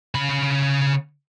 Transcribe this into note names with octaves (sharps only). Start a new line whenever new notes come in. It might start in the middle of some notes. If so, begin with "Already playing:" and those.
C#3 B5